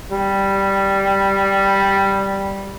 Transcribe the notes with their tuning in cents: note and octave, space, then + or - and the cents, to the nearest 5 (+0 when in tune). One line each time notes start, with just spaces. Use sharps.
G3 +0